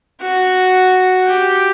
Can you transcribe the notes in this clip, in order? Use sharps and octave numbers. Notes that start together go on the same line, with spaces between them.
F#4
G4